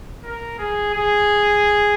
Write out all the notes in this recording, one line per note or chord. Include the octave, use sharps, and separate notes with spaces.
A#4
G#4
G#4